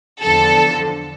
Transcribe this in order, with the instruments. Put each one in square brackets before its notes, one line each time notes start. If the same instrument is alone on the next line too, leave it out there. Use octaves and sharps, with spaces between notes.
[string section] E2 D3 F3 A4